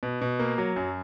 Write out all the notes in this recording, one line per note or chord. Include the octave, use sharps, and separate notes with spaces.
B2
B2
A#3
F#3
F#2